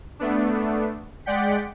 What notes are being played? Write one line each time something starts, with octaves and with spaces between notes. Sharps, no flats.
A3 B3 D4
G#3 D5 F#5 G5 B6